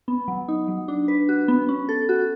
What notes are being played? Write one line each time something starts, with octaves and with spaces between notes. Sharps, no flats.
B3
F#3
D#4
F#3
D4
B4
F#4
B3
C#4
A4
F#4